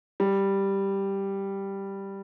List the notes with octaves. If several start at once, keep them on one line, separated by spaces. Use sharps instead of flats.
G3